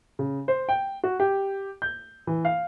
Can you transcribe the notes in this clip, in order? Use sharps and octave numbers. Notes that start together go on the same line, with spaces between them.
C#3
C5
G5
F#4
G4
G6
E3
F5